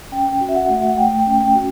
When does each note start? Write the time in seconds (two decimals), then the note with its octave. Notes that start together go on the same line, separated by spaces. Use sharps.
0.12 C#4 G5
0.41 F#4
0.49 E5
0.55 F#5
0.69 A3
0.76 E5
0.87 F#5
0.98 A3 G5
1.19 G5
1.27 C#4
1.41 G5
1.55 F#4